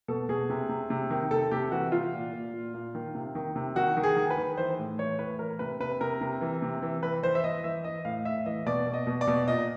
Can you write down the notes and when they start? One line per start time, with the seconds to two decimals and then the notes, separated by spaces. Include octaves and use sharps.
0.08 B2 A4
0.29 B2 G#4
0.50 C3
0.69 C3
0.90 C3
1.10 D#3
1.31 C3 A4
1.51 C3 G4
1.72 E3 F#4
1.92 E3 F4
2.13 A#2
2.33 A#2
2.53 A#2
2.74 A#2
2.95 D#3
3.15 C3
3.35 D#3
3.56 C3
3.76 D#3 F#4
3.97 D#3
4.03 G#4
4.16 D#3
4.30 B4
4.37 D#3
4.57 E3 C5
4.78 A2
4.98 E3 C#5
5.19 A2 B4
5.39 E3 A#4
5.59 C3 B4
5.80 C3 B4
6.01 C3 A#4
6.21 C3
6.41 E3
6.62 C3
6.82 E3
7.03 E3 B4
7.23 E3 C5
7.35 E5
7.44 E3 D#5
7.64 E3 E5
7.84 E3 D#5
8.05 A2 F5
8.25 A2 E5
8.46 E3 D#5
8.66 B2 D5
8.87 B2
8.94 D#5
9.07 B2
9.21 D5
9.27 B2
9.48 A#2 D#5